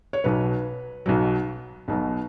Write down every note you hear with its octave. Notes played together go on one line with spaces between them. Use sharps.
C#5
B1 B2 F#3 B4
B1 B2 F#3
B1 B2 F#3